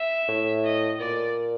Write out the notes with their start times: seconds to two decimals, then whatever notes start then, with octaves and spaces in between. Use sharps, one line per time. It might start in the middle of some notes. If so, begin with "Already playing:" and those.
Already playing: E5
0.28 A2
0.64 D#5
1.00 A#2 D5